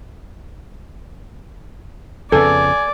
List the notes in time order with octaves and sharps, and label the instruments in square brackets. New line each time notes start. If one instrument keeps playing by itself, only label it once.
[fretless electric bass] F2 C#3 B3 [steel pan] A4 [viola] D5 [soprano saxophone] G#5